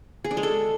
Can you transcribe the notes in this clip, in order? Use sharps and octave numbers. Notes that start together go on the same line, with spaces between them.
G#4
D4
G#3
A4